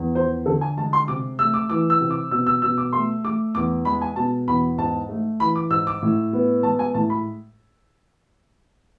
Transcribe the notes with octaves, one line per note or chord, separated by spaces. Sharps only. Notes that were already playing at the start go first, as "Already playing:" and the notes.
Already playing: E2
F3 C5
D3 A4
G#5
G#3 A5
C6
C3 D6
A3 E6
D6
E3 D6
E6
C3
D6
B2 E6
E6
B2 E6
D6
A3 C6
A3 D6
E2 D6
G#3 B5
G#5
B2 A5
E2 B5
G#2 A5
A3
E3 B5
D6
G#2 E6
D6
A2
B3
G#3 A5
G#5
A2 A5
B5